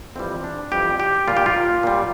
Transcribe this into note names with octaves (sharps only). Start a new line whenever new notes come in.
F2 E3 G3 C4
D4
F2 E3 G3 G4
G4
A#2 G3 F4
G4
F4
A#2 G3